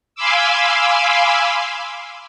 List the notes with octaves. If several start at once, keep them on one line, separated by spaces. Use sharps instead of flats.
F5 G#5 B5 C6 D6 E6